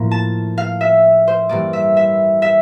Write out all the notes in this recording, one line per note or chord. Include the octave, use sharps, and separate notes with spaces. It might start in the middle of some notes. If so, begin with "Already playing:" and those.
Already playing: A2 F3 A#3
A5
F5
E5
C5
G2 E3 A#3 D5
E5
E5
E5